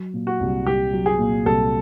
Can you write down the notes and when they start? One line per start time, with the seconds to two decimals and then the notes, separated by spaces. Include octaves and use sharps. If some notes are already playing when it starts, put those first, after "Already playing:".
Already playing: F#3
0.14 A#2
0.27 F#4
0.40 C2
0.66 C2 G4
0.93 F#3
1.06 G#4
1.19 A#2
1.46 C2 A4